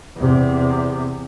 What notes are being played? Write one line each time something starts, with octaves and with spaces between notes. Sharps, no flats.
E2 C3